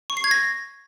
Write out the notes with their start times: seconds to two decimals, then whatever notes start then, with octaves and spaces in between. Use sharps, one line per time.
0.10 C#6
0.17 C7
0.24 G#6
0.31 A#6